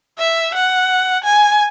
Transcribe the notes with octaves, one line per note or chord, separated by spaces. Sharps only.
E5
F#5
G#5